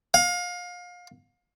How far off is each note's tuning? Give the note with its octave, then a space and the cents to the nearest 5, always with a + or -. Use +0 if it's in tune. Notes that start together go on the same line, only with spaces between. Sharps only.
F5 +30